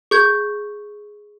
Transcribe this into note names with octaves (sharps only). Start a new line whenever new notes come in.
G#4 C#6 G6 G#6